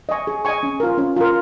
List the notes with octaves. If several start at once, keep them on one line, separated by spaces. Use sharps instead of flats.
D#5 G#5 C#6
G#4
D#5 G#5 C#6
C#4
F4 A#4
C#4
F4 A#4